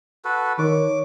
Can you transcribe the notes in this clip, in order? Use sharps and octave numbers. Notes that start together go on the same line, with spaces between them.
F#4 A4 B4
D#3 C#5 D6